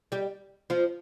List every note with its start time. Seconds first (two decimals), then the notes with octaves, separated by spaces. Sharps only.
0.12 G3 G4
0.70 F3 F4